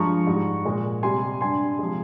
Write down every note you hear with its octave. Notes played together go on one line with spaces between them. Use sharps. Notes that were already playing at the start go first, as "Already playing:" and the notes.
Already playing: G2 F3 G#3 A#5 C#6
G#2 G3
A#2 G#3
C3 G3 G#5 C6
G2 G3 G#5 C6
C3 F3 G#3